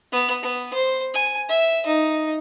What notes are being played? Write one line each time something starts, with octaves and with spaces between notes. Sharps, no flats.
B3
B3
C5
G#5
E5
D#4